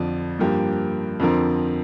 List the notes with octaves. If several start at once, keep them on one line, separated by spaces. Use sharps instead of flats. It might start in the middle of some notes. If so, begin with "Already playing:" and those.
Already playing: F2 D3 F3 D4
G2 F3 A#3 G4
F2 D3 F3 C4 A#4